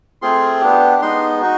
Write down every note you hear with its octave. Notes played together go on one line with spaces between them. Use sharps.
A3 C4 F4 G#4 C6
B3 D4 G4
G#3 B3 D#4 C6
D#4 F#4